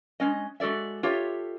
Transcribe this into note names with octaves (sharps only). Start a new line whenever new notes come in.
G#3 C#4 D#5
G#3 F#4 A4 D5 E5
F4 G4 A4 C#5 E5